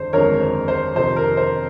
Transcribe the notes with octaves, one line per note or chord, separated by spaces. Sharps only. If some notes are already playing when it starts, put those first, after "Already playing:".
Already playing: G1 F2 D#3 G#3 C5
G1 F2 D#3 G#3 A#4 C#5
C5
C5
F2 C3 D#3 C5
A#4
C5